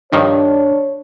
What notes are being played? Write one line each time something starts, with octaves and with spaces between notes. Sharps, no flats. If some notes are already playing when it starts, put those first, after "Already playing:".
G2 D#3 F3 D4 C#5